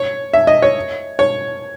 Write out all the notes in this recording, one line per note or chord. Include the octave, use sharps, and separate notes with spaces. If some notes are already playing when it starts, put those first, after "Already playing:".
Already playing: C#5
E5
D#5
C#5
C#5